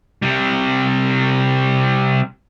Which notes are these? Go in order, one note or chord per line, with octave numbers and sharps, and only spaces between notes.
C3 G3